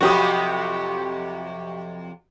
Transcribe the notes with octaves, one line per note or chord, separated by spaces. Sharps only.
F2 C3 F#3 F#4 G4 D#6